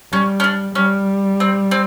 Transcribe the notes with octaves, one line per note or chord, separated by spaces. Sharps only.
G3 C#4
C#4
D4
G3 C#4
C4
C4